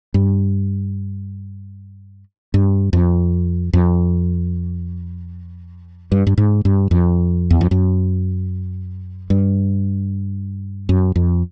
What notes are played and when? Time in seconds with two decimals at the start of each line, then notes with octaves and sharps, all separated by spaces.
0.14 G2
2.54 G2
2.93 F2
3.73 F2
6.12 G2
6.27 G2
6.38 G#2
6.65 G2
6.91 F2
7.51 E2
7.61 F2
7.71 F#2
9.30 G2
10.89 F#2
11.16 F2